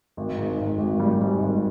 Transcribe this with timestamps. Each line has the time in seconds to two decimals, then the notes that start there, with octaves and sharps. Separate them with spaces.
0.17 G#1
0.38 G#2
0.58 G#1
0.79 G#1
1.00 G3
1.20 G#2
1.40 G#1